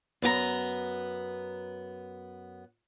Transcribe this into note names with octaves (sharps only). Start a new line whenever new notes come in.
F#2 B3 G4 A#5